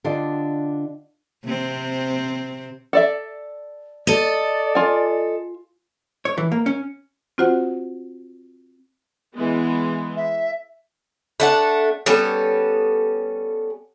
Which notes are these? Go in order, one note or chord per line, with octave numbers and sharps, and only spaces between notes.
D3 D4 F4 G4 D#5
C3 C4
A4 D5 E5
A4 D5 D#5
F4 G#5
C#5
E3
A#3
C#4
C4 F4 F#4 C5 F#5
E3 G#3 B3
E5
A3 D4 F#5
G3 B3 C#4 A4